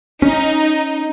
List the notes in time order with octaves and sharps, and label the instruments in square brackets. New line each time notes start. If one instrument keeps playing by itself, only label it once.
[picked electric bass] C#4 [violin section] D#4